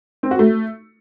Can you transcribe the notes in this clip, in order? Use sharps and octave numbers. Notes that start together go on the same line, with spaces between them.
C4
F#4
A3